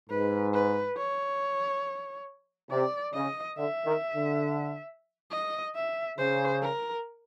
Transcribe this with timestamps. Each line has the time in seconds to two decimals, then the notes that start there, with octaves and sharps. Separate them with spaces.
0.10 G#2 B4
0.53 B4
0.97 C#5
2.71 C3 D5
3.14 C#3 D#5
3.58 D3 E5
3.86 D#3
4.16 D3
5.31 D#5
5.75 E5
6.18 C#3 C5
6.62 A#4